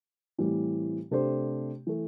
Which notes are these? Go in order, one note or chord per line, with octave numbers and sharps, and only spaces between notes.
A2 E3 G3 C4 G4
C3 A3 D4 G4 C5
E3 A3